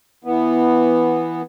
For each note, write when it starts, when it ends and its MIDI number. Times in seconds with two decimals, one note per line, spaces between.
0.25 1.42 52
0.25 1.42 59